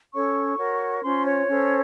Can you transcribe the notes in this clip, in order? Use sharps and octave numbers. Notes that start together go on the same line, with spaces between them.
C#4 A4 C#5 C#6
F#4 A#4 C#5
C#4 F4 C5 C6
C#5
C#4 A4 C5